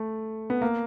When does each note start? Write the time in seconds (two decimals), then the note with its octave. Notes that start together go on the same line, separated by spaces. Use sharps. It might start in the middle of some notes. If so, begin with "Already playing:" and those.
Already playing: A3
0.50 B3
0.62 A#3